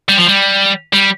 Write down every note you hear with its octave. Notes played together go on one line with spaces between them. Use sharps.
G3
F3
G3
G3